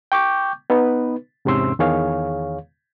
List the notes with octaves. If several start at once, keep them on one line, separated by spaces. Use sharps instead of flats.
G5 C#6 D6 G6
B3 D#4 B4
E2 G#2 C3 C#4 C6 E6
E2 D#3 G#4 C#5 F5